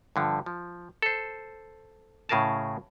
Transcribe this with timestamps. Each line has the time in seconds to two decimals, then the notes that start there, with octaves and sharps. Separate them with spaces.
0.16 G2 D3 F3
0.46 F3
1.02 A4 C5
2.29 A2 C#3 G#4 A#4 A5